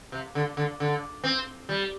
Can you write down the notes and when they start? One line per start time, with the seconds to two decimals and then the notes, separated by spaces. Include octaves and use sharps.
0.12 C3
0.35 D3
0.57 D3
0.80 D3
1.24 C4
1.69 G3